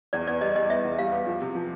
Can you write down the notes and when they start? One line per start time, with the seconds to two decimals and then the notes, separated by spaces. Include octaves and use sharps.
0.13 E2 D5
0.27 B3 D5
0.41 G3 D#5
0.56 G3 D#5
0.70 B3 E5
0.85 E2
0.99 G3 F5
1.12 B3
1.27 F3
1.42 C3
1.55 F3